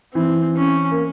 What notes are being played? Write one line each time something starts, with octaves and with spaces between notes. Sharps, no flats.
E3 C4
C#4
A#3